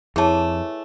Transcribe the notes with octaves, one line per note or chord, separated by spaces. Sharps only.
F2 E3 A3 E4 G#4 C#5 A5